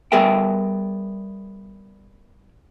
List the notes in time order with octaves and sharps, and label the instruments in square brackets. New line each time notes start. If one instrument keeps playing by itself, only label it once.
[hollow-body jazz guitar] G3 B3 G#4 A#4 E5 G5